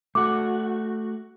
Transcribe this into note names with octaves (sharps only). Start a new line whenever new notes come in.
A3 F#4 D6